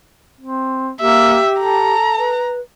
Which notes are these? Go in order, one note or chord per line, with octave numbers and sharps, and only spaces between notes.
C4
A#3 G4 E5
A4 A#5
B4